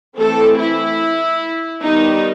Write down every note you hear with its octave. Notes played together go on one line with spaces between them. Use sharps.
E3 A3 C4 A4
E4
D#3 G3 B3 D#4